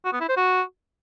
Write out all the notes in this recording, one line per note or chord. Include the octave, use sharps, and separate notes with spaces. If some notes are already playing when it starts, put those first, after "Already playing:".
F#4
B3
E4
C5
F#4